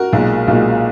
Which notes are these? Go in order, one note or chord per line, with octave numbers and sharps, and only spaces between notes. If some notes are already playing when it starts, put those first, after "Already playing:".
Already playing: F#4 A#4
B1 A#2 G#3
B1 A#2 G#3